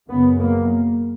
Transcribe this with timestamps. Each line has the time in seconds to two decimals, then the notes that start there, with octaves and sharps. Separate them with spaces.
0.09 F#2 C#3 B3
0.39 A#3